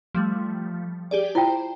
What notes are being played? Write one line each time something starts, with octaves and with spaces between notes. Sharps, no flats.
F3 G3 A3
G4 G#4 D5
E4 F4 C5 G5